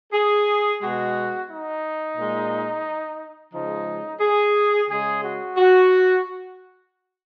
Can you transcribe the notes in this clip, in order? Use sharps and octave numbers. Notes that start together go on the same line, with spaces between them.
G#4
B2 G#3 F#4
D#4
A#2 G#3
C#3 F3 G#3 D#4
G#4
C#3 G#3 G#4
F#4
F#4